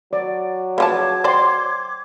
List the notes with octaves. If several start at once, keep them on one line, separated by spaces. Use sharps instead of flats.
F#3 D5
C#3 F3 B4 A5 D6 G#6
C5 D5 G5 C6